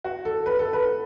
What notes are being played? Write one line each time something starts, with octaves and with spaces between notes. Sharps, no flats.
F#4
A4
B4
A4
B4